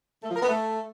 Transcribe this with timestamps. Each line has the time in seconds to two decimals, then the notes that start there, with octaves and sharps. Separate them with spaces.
0.23 A3
0.29 F3
0.36 A#4
0.42 B3
0.48 A3